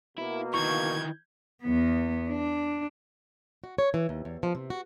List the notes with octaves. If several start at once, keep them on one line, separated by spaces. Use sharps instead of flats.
B2 A#3 E4
D#3 E3 C#6 G6 G#6
E2 B3
D4
F#4
C#5
E3
D#2
E2
F3
C3
F#4